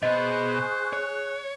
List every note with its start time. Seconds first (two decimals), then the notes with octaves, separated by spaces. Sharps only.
0.03 B2 B3 G#4 C5 D#5 C#6 F#6
0.93 C#5